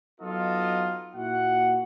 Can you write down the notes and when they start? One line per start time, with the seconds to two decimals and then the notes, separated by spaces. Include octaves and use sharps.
0.21 F#3 B3 D#4 F4 A4 D#5
1.15 A#2 E4 F#4 F#5